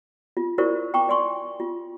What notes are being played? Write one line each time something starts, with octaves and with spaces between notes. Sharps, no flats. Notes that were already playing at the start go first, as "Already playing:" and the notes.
F4
E4 F#4 A#4 C5 D5 C#6
G5 A#5 C#6 D6
D5 G#5 C6 C#6
F4